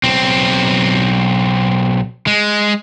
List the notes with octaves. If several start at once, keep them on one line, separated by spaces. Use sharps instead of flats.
B1 C4
G#3